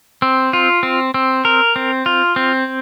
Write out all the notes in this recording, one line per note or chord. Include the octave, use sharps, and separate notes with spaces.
C4
F4
C4
C4
A#4
C4
F4
C4